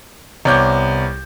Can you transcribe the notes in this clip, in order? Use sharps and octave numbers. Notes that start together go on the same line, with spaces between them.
C2 B3 C#5 D6 G6